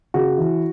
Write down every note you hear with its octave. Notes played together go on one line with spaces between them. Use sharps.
C#3 F#4
E3